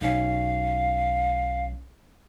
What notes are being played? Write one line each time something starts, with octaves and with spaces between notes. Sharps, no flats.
B1 C#4 F5